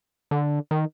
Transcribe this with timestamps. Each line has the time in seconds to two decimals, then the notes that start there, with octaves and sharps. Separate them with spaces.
0.31 D3
0.71 D#3